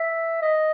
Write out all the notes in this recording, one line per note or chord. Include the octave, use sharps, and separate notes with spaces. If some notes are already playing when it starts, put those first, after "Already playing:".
Already playing: E5
D#5